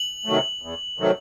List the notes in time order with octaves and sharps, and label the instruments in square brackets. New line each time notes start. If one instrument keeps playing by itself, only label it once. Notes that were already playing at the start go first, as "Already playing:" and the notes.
Already playing: [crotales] F#7
[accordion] C3 D#3 F#3 A3
E2
C3 D#3 F#3 A3